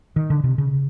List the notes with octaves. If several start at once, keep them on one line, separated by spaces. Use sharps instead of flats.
D#3
D3
C3
C#3